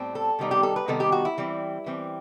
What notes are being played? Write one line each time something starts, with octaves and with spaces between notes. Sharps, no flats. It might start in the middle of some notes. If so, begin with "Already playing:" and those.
Already playing: A2 G3 C4
A4
C3 D#3 G3 B3 D#4
G4
A4
B4
C3 D#3 G3 B3 D#4 A4
G4
F#4
E4
E3 G3 C4
E3 G3 C4